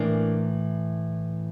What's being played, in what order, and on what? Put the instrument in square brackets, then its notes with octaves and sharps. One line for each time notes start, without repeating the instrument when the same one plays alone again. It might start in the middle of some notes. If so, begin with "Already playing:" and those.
Already playing: [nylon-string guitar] A2 E3 A#3 D4